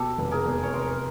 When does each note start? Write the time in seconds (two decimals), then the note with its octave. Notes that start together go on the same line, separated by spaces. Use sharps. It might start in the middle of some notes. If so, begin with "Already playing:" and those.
Already playing: B2 G4 A4
0.18 F1
0.31 G#4 A#4
0.46 E2
0.63 C#5
0.73 F1 A#4 C5